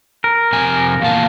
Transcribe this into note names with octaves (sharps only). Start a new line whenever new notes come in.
A#4
F2 C3 G#5
E2 A#2 F5 A5